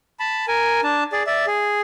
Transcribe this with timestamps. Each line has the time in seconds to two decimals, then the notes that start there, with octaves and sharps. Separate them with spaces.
0.20 A5 B5
0.48 A#4 G#5
0.83 D4 A5
1.12 G#4 D5
1.27 D5 E5
1.47 G#4